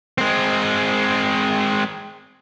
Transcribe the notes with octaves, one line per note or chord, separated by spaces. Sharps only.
G#3 C4